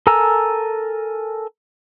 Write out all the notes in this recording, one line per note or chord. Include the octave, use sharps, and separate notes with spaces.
A4 A#4 G#5 A#5 E6